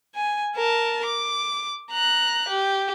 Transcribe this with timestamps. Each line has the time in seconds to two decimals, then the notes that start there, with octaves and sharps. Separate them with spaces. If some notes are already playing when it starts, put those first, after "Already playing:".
0.15 G#5
0.55 A#4 A5
1.05 D6
1.91 A#5 F#6
2.49 G4